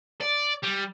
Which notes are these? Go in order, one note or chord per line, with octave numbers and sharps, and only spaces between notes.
D5
G3